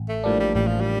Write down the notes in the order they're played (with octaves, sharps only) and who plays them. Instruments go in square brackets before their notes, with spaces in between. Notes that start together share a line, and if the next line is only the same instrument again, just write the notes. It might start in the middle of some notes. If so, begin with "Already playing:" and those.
Already playing: [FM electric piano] A1
[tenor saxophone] A3
[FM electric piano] A2 F3 A#3 D4 [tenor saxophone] G3
[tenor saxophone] G3
[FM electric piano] A1 [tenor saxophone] G3
[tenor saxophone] F3
G3